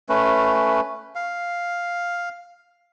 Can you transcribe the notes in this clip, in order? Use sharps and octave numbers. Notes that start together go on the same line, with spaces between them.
A3 C#4 B4
F5